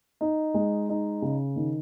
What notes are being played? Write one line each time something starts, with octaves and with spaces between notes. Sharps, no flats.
D#4
G#3
D#4
C#3
D#3